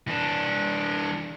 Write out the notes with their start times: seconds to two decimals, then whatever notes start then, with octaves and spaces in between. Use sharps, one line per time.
0.08 E3 D4